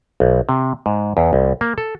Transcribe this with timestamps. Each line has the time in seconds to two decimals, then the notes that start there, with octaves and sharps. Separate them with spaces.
0.20 B1
0.49 C3
0.86 G#2
1.17 E2
1.33 C2
1.61 A#3
1.78 A4